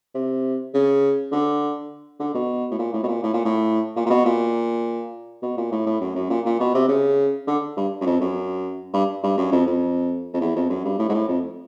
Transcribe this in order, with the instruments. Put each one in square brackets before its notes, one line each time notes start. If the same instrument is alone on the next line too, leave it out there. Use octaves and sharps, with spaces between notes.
[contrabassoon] C3
C#3
D3
D3
B2
A2
A#2
A2
B2
A#2
A2
A#2
A2
A#2
A#2
B2
A#2
B2
A#2
A2
A2
F#2
F#2
A#2
A#2
B2
C3
C#3
D3
G2
F#2
F2
F#2
G2
G2
F#2
F2
F2
F2
E2
F2
F#2
G2
A2
G#2
A2
F2